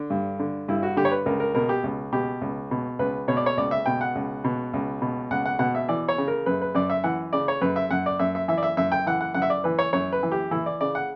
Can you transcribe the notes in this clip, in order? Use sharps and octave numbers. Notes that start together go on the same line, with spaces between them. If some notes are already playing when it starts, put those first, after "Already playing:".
Already playing: D3
G2
D3
G2 E4
F#4
D3 G4
C#5
B4
C#2 A#4
A#4
B2 A#4
G4
C#2
B2 G4
C#2
B2
C#2 B4
B2 C#5
D5
C#5
C#2 D5
E5
B2 G5
F#5
C#2
B2
C#2
B2
C#2 F#5
F#5
B2 F#5
E5
E3 D5
C#5
C#3
A#4
F#2 B4
B4
F#2 D5
E5
E3 F#5
C#3 D5
C#5
F#2 B4
E5
F#2 F#5
D5
F#2 E5
E5
E3 E5
D5
E5
F#2 E5
G5
E3 F#5
F#5
F#2 F#5
E5
D5
E3 B4
C#5
F#2 C#5
B4
E3
G4
E3 E4
D5
C#3 D5
F#5